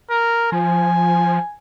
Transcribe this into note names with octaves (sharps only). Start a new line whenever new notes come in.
A#4
F3 G#5